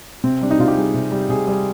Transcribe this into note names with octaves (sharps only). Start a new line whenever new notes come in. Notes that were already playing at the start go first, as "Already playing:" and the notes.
C3 C4
G3 D4
D#4
C3 F4
G4
G3 G#4
C3
G3
C3 G#4
G3 G#4